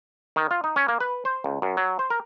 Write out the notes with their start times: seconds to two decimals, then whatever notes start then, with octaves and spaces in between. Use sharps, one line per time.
0.36 D#3
0.51 F4
0.64 D#4
0.76 C#4
0.88 A#3
1.00 B4
1.25 C5
1.44 C#2
1.62 F#2
1.77 F#3
1.99 C5
2.10 A#4